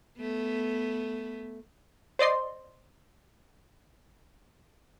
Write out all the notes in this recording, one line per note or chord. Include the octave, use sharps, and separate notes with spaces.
A3 B3
C5 D5 D#5 C6